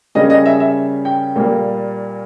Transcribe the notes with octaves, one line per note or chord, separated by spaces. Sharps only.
C#3 G3 A#3 C#4 D#5
D#5
E5
E5
G5
A#2 G3 A#3